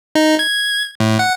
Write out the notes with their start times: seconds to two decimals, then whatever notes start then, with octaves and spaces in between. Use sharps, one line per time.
0.15 D#4
0.39 G#6
1.00 A2
1.19 F#5